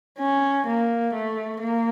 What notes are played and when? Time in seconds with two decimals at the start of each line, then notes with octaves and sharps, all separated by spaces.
0.19 C#4
0.66 A#3
1.14 A3
1.60 A#3